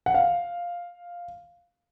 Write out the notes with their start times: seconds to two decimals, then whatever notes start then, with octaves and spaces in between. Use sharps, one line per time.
0.06 F#5
0.14 F5